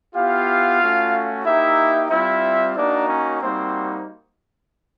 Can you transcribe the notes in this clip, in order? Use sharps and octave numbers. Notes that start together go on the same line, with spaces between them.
B3 E4 F4 G4 F5
A3 C#4 F#4
A#3 D#4 E4 G4 E5
G3 C4 E4 F4 E5
A#3 D4 D#4 F#4 D5
C#4 C#5
G3 A#3 C4 D#4 F#4 C5